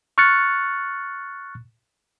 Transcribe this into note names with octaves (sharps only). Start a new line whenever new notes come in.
C#6 F6 F#6 A6 C#7